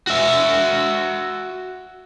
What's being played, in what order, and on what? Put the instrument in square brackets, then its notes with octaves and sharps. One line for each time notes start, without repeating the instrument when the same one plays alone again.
[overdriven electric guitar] F#4 E5